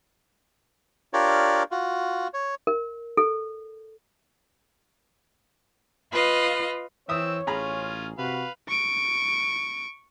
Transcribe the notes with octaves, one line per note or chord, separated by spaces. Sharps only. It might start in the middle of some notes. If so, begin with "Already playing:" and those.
D4 F4 G4 A#4 C#5 D5
F4 F#4
C#5
A#4
A4
F4 B4 D#5 F5
E3 C4 C#5 E5 D#6 E6
A1 C#4 F4 G#4 A#5 B5
C3 F#4 B4 F5
C#6 D7